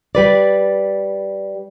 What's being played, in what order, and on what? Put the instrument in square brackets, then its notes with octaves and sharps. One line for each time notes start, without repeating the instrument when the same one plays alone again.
[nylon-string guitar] G3 B4 D5